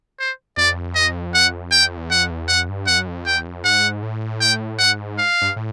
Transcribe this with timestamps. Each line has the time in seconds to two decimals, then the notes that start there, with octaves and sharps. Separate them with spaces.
0.20 C5
0.57 F2 D5
0.95 D#5
1.34 F#5
1.72 E2 G5
1.85 F2
1.97 E2
2.10 F2 F#5
2.31 E2
2.48 F2 F#5
2.69 G2
2.87 F2 F#5
2.98 F#2
3.07 F2
3.26 E2 G5
3.45 F2
3.64 G#2 F#5
4.03 A2
4.41 G5
4.79 G#2 F#5
5.18 F5
5.42 G2
5.56 A2